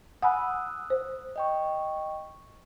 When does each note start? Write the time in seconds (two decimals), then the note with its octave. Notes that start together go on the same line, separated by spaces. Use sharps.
0.22 F#5 G#5 B5 D#6 E6 F#6
0.90 C5
1.36 D#5 G5 C#6